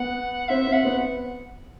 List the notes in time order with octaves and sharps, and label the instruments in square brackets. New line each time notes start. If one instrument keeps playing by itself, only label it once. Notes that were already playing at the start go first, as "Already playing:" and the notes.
Already playing: [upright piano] B3 [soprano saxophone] F#5
[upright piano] C4 [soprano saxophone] E5
[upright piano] C4
[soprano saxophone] F#5
[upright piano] B3